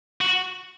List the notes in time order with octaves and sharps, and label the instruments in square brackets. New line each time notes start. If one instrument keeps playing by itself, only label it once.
[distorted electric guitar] F#4